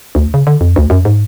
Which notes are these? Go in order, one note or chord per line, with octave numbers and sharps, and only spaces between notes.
D2
C#3
D3
F2
D2
F#2
G#2